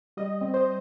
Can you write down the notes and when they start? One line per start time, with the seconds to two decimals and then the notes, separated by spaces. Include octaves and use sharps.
0.17 G3 D#5
0.41 C4
0.54 C5